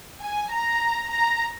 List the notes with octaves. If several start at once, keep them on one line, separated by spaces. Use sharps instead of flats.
G#5
A#5
A#5